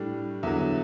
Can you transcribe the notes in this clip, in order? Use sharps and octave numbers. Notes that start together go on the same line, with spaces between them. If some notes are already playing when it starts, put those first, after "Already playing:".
Already playing: A2 G3 D4
E2 D3 F#3 E5